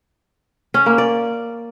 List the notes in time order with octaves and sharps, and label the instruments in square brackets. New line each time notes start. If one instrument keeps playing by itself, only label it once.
[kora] C#4
A#3
D5